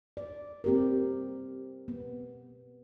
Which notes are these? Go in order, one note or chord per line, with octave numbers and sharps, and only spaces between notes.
D5
C4 G4 A#4
B3